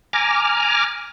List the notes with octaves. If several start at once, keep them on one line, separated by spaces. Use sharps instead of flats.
G#5 A#5 D6 F6